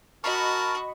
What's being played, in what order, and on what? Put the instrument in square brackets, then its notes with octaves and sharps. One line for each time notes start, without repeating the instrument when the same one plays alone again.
[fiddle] F#4 [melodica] A#4 A5 [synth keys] D#5 B5 C#6